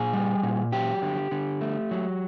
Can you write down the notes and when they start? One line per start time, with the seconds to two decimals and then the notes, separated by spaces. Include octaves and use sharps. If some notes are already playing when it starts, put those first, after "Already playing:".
Already playing: A#2 G#4
0.13 G3
0.43 A#2
0.72 F#3 G4
1.02 D3
1.31 D3
1.61 A3
1.91 F#3